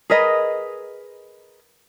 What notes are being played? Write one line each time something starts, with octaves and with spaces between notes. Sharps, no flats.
G#4 A#4 B4 D#5